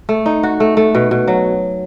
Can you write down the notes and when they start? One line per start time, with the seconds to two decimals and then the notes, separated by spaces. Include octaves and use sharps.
0.09 A3
0.26 D#4
0.43 F#4
0.60 A3
0.77 A3
0.95 B2
1.11 B2
1.28 F#3